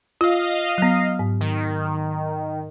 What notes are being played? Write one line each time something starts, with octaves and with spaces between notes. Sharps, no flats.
F4 D#5 F5
F#3 B3
G#2
D#3